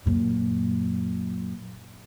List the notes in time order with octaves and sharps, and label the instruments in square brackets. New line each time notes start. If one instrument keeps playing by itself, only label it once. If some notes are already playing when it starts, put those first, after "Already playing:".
[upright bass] F#2 A#2